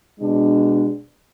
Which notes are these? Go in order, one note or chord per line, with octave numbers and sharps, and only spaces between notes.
B2 G#3 D4